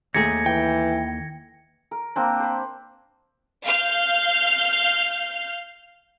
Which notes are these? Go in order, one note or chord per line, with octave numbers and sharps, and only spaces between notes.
D#2 A3 G#4 G#6 A#6 C#7
E3 G5
A#4
A#3 C4 D4
C5 B5
F5 F6 G6